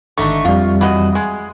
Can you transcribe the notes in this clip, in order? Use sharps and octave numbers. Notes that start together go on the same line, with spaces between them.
G#1 D3 A3 D#4 C#6
F2 G3 F4
E3 F#4 D#5
G#3